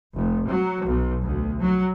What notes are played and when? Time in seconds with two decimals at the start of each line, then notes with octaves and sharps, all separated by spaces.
0.15 F1
0.47 F#3
0.84 B1
1.24 D2
1.60 F#3